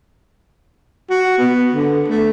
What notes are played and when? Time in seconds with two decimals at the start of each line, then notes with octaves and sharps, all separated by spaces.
1.10 F#4
1.38 B3
1.73 D3
2.08 A3